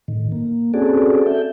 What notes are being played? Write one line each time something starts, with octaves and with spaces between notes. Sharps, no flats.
A2 D#3
A#3
C4 C#4 F#4 G#4 A4 D5
A4 E5 G6